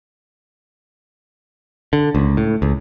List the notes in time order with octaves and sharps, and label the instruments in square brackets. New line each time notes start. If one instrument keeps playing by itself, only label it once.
[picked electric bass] D3
C#2
A2
C#2